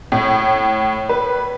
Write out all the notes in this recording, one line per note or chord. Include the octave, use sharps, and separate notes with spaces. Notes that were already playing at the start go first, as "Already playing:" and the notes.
A2
B4